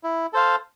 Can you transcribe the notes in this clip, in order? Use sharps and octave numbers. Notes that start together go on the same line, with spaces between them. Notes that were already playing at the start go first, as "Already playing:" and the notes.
E4
A4 C5 F5